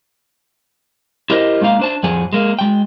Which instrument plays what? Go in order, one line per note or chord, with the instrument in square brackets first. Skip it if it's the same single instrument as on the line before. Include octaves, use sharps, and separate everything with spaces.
[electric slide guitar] E4 G4 A#4 C5 D#5
G#3 A#3 D#4 F5
D4 C5 A5
F2 A2 F3 G#4 F#5 G#5
G#3 A#3
G#3 G5